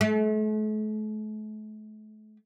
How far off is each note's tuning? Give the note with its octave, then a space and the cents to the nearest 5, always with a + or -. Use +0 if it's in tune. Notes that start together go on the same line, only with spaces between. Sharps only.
A3 -40